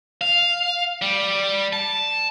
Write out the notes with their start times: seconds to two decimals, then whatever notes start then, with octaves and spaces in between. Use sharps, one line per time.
0.21 F5
1.02 G3
1.73 A5